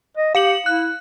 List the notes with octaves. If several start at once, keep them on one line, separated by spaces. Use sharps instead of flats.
D#5
G4 F5 C#7 F#7
E4 F#6